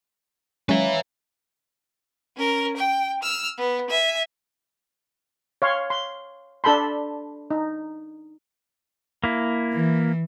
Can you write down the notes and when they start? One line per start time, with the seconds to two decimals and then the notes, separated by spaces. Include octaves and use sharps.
0.69 F#3 G#3 C#4 B4 C#5 E5 F5 A#5
2.37 C#4 A#4
2.76 G5
3.23 E6 F6
3.58 B3
3.90 E5 G#5
5.62 C#5 F5 C6
5.90 C6
6.64 D4 A4 A5 B5 C6
7.51 D#4
9.24 A#3 E4
9.73 E3